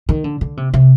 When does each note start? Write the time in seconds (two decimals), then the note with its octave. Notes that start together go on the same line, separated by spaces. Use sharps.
0.09 D#3
0.24 D3
0.41 D3
0.57 C3
0.74 C3